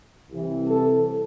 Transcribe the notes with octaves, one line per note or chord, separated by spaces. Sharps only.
C2 C3 E3
A4